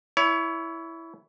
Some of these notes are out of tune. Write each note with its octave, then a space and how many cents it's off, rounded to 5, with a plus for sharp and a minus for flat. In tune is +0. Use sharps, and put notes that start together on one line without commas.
E4 +0 C#5 +30